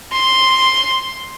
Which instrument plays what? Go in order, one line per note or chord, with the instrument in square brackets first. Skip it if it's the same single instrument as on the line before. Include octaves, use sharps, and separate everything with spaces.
[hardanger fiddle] C6